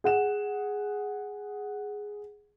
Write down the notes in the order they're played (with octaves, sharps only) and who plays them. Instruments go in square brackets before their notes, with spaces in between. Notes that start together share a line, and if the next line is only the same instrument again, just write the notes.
[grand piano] G#4 F#5 E7